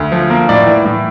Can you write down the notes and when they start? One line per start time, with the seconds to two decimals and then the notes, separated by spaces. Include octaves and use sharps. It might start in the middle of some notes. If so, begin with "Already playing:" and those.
Already playing: D2
0.12 F3
0.30 A#3
0.49 A2 D5
0.66 E3
0.85 A2